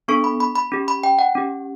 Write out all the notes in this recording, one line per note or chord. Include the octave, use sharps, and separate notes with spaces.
B3 D4 A4 C#6
B5
B5
B5
C#4 G4
B5
G5
F#5
C#4 G4